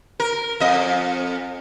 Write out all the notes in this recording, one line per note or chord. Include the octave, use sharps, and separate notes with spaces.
A#4
F2 D#5